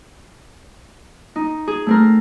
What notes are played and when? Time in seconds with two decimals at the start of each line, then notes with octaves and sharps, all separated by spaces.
1.36 D#4
1.68 G#4
1.86 A3 C4 A#4